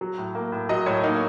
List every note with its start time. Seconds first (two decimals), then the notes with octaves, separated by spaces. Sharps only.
0.01 F#3
0.18 A2
0.35 A#3
0.52 A2
0.69 F#3 D#5
0.86 A2 C#5
1.04 A#3 D#4